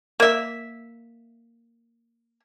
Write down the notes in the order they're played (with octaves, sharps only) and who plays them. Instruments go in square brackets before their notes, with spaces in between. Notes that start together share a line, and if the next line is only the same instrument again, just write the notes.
[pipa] A#3 E5